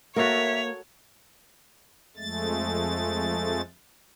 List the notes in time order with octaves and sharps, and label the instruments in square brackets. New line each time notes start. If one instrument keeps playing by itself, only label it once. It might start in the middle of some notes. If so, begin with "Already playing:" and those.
[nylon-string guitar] A#3 [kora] F#4 A4 A#4 [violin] C#5 [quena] E5
[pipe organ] F2 G#3 A3 A6